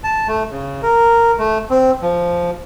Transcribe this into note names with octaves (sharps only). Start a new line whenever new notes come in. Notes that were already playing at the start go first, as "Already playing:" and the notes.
A5
A3
C#3
A#4
A3
C4
F3